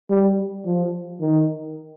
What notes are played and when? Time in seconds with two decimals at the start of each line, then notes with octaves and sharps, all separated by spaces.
0.10 G3
0.66 F3
1.21 D#3